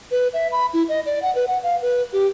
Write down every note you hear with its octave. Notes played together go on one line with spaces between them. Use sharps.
B4
E5
B5
E4
D#5
D5
F#5
B4
F#5
F5
B4
G4